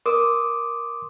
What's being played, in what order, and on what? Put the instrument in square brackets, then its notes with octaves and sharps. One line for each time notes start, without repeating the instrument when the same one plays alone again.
[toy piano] A#4 [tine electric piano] C6 D6 D#6